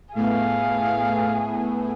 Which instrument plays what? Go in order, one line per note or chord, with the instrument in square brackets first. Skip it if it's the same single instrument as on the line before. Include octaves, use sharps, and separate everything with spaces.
[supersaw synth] A2 A3 B3 [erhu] G#4 [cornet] F5